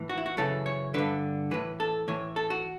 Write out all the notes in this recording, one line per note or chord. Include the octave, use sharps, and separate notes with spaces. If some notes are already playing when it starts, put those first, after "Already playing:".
Already playing: A2 E3
F#4
E4
F#4
F#2 C#3 E3 A4
C#5
G2 D3 B4
A2 E3 B4
A4
A2 E3 C#5
A4
F#4